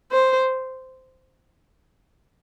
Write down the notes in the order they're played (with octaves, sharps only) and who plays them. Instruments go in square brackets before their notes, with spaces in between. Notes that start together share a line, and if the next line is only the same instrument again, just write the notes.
[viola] C5